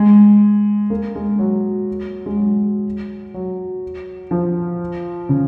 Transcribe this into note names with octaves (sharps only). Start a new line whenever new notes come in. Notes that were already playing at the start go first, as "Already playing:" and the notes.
Already playing: G#3
A#3
G#3
F#3
G#3
F#3
F#3
F3
C#3